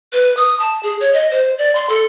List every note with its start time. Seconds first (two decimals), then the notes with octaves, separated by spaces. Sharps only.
0.13 B4
0.37 D#6
0.60 A5
0.83 G#4
1.00 C#5
1.13 D#5
1.31 C5
1.58 D5
1.75 C6
1.89 A4